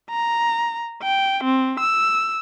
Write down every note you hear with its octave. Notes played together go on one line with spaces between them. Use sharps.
A#5
G5
C4
E6